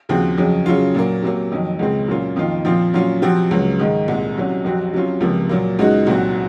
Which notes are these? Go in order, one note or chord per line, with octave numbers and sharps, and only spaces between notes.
D#2 C#3 F3 C4 F#4
F2 C#3 F#3
C#3 F#3 C#4 F4
A#2 F#3 A#3
C3 F#3 A#3
F2 D#3 F#3
C#2 C#3 G#3 C4
A#2 F#3 A#3 C#4 F4
F2 D#3 A#3 F4
A#2 F3 C4 F4
A#2 F#3 C#4 F4
C3 F3 C4 F#4
C#2 C#3 F#3
G#2 D#3 G#3
C2 A#2 G#3
C2 C3 F#3 C#4 F#4
F2 C3 F#3 C4 F#4
C3 F#3 C#4 F4
C#2 C3 F3 A#3
A#2 F#3 A#3
C#2 C#3 G#3 D#4 F#4
C2 A#2 F#3 C4 F#4